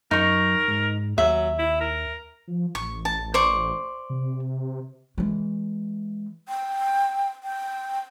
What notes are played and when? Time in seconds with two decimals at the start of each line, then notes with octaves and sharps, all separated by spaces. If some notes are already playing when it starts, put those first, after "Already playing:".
0.11 F#2 D#4 A#4 C#6
0.68 G#2
1.18 D#2 F#3 E5
1.59 E4
1.81 A#4
2.48 F3
2.75 A1 C#6
3.05 A5
3.34 C5 D5 C#6
4.10 C3
5.18 E3 G#3
6.48 G5
7.43 G5